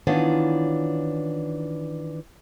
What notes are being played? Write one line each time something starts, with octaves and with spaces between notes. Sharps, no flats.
D#3 E3 B3 C#4 D4 F4